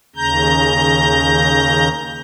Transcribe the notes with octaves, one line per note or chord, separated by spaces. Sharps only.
D#2 C#3 A#5 G6